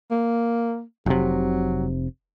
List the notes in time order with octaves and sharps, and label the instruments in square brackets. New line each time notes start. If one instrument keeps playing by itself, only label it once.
[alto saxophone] A#3
[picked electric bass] F1 C3 [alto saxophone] F#3